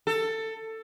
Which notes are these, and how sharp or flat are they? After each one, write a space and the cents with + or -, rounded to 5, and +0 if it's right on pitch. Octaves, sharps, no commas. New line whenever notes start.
A4 +15